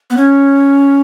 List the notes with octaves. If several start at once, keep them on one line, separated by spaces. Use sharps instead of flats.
B3
C#4